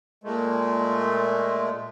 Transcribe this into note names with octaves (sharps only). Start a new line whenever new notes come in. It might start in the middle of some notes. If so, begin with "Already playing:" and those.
A#2 G#3 A3